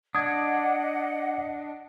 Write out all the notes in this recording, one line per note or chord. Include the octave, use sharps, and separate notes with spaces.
D4 D#5 F#5 D#6 G#6